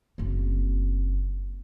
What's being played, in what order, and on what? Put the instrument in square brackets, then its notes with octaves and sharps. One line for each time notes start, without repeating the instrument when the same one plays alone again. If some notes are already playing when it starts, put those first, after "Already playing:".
[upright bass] F#1 C4